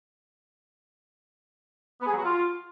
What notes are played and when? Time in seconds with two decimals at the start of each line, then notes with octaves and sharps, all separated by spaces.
2.01 B3
2.06 G#4
2.12 F#3
2.17 F#4
2.23 F4